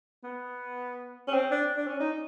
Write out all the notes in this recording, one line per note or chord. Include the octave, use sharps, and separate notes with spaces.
B3
C#4
C4
D4
D4
C#4
D#4